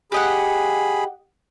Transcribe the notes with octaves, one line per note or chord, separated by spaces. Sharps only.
G4 G#4 D#5 F#5 B5